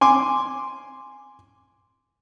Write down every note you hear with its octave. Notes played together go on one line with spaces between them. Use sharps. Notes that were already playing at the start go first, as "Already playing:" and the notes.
G#5 C6 D6